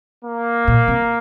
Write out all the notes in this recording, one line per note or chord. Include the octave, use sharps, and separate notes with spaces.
A#3
A#2
C3